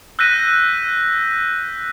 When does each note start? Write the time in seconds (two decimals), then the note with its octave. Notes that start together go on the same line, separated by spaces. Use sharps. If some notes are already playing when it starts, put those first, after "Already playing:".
0.19 E6 F#6 G6 A#6 B6 D#7